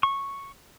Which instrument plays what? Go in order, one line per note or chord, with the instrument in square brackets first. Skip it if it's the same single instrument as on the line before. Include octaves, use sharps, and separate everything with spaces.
[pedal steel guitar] C#6